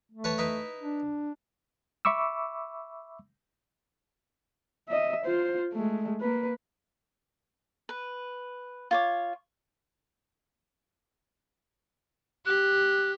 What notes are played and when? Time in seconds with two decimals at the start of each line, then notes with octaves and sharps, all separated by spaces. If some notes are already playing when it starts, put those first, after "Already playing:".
0.12 A3
0.24 B4 C#5 A5
0.38 D#4 E4 B4
0.80 D4
2.05 E5 B5 C#6 D6 E6
4.89 D#5 E5
5.25 F4 C5
5.72 G#3 A3
6.20 A#3 B4
7.89 B4
8.91 F4 C#5 D6
12.46 G4 F#6